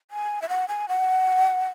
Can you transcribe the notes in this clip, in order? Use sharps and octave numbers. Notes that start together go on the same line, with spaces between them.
G#5
E5
F#5
G#5
F#5